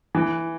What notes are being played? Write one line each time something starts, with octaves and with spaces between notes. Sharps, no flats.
E3